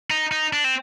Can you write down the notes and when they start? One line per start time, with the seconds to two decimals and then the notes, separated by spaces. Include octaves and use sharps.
0.10 D#4
0.32 D#4
0.53 D4
0.64 C4